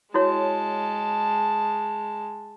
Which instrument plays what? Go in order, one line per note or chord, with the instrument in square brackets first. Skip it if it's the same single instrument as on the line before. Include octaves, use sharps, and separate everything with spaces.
[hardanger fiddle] G#3 A5 [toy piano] E4 F#4 C#5